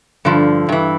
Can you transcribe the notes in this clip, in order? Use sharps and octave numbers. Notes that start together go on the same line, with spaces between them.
G2 D3 F3
G2 E3